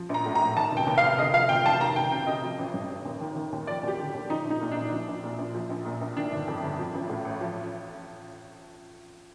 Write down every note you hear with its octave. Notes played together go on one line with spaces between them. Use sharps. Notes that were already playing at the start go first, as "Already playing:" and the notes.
Already playing: F3
A#1 A#5
A2
A#5
A#1
D#3 A5
F1
G5
D#2
F5
F1
D3 D#5
F3 F5
D#2 G5
F1 A5
D#3 A#5
D2 G5
C3 G5
D2 D#5
F3
A1
G2
A1
D#2
D#3
D#3
D#2
F3 D5
D#2 G4
D3
D#2
F3 D#4
A#1
D#4
A#2
A#1 D4
F3
A#1
A#2
A#1
F3
A#1
A#2
A#1
D#3 D4
G1
F2
G1
F3
A1
A2
A1
F3